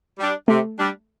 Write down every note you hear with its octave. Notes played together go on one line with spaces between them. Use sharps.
G3 D4
C3 A3
G3 D4